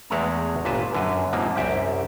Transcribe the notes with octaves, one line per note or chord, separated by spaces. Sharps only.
E2 G#3 A3 F#5 A5 A#5
G1 A#2 B4 A5
F#2 D3 B4 G#5
G#2 C3 F3 A#3
C2 F#2 G4 E5